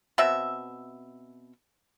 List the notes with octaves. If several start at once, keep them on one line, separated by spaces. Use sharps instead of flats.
B2 C4 E5